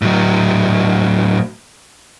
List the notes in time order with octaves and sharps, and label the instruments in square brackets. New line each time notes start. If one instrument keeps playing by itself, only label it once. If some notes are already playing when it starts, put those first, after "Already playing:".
[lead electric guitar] A2 F#3